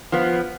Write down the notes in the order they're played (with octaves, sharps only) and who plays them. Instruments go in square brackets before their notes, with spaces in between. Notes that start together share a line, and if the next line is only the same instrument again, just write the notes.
[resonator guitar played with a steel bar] F3 B3